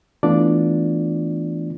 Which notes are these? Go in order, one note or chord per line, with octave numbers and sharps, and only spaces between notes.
E3 A3 B3 D4 F4 D5